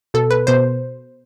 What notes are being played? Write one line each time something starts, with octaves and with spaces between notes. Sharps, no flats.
B2 A4
B4
B2 C5